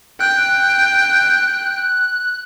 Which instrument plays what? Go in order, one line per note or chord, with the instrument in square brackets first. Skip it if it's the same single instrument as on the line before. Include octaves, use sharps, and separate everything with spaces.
[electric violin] G5 [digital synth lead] F#6